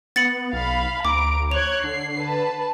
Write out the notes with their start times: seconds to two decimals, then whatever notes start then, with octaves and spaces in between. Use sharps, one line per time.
0.16 B3 A6 C#7 F#7
0.53 B1 F5 B5
1.05 D2 A#5 D6 D7
1.51 C#5 F#6 G#6 F7
1.84 D3 C7
2.19 B4 A5